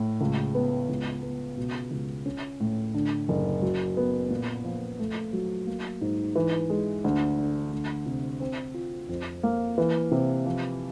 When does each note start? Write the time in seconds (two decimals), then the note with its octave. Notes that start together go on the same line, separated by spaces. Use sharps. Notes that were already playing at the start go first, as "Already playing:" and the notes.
Already playing: A2
0.21 C#2
0.55 B3
0.89 C#2
1.23 B3
1.57 B2
1.91 C#2
2.26 C#4
2.60 A2
2.94 D3
3.28 F#1
3.62 F#3
3.97 B3
4.30 A#2
4.65 F3
4.99 A3
5.33 F#3
5.67 A#3
6.01 G#2
6.35 E3
6.70 G#3
7.04 D2
7.38 D3
7.73 D2
8.06 C3
8.40 C4
8.74 F4
9.09 F2
9.43 A#3
9.78 E3
10.11 C3
10.46 F3